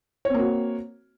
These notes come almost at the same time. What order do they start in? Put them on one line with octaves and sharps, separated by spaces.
C#5 C4 A#3 F#4